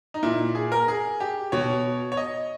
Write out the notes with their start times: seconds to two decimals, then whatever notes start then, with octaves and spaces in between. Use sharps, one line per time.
0.14 D#4
0.23 A#2 E4
0.55 G#4
0.72 A#4
0.88 G#4
1.20 G4
1.52 B2 C#5
2.12 C#5
2.17 D#5